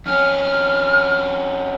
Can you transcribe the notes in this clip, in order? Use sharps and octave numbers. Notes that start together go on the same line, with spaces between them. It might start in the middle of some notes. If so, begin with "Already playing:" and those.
F2 C#4 F6